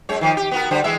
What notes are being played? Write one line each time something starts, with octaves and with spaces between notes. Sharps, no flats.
F#2 G#3 C#5
D#3 F3
G4
B3 F#4 A#4
D3 G3 C5
E3 G#3 E5